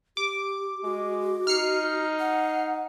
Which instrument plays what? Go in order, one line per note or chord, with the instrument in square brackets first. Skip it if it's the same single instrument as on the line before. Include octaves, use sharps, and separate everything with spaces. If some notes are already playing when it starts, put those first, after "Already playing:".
[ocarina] G4 [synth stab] D6
[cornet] G#3 [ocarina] F#4
[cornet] D#4 [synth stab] F6 C7 C#7
[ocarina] F#5